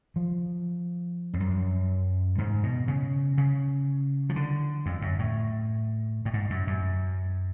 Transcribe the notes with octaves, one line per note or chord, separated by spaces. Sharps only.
F3
F2
F#2
G#2
B2
C#3
C#3
F3
D3
F2
F#2
A2
A2
G#2
F#2
F#2